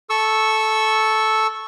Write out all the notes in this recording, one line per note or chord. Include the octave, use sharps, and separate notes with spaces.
A4 C#6 E6